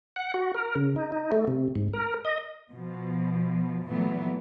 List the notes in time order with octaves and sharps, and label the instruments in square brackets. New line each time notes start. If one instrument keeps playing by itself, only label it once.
[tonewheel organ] F#5
F#4
A#4
C#3
D#4
D#4
A3
C3
G#2
A#4
D#5
[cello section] B2 F3
A#2 E3 F#3 A3 B3